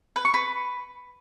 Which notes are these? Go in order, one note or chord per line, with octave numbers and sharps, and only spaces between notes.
B4
C#6
B4